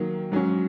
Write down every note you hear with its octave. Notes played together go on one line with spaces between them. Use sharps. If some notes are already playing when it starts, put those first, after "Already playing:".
Already playing: D#3 F#3 A#3
G#2 F#3 C#4